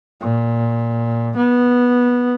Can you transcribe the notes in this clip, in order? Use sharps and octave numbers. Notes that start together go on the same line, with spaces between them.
A#2
B3